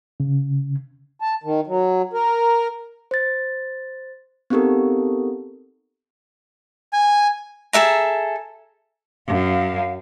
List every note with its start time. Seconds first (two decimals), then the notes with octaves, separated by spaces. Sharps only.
0.20 C#3
1.20 A5
1.43 D#3
1.67 F#3
2.13 A#4
3.11 C5 A6
4.50 B3 C4 D#4 G4 A4 A#4
6.93 G#5
7.73 G#4 A4 E5 A#5
9.27 F#2 F5